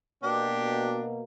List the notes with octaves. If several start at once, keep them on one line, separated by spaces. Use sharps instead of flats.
B2 A#3 D4 G4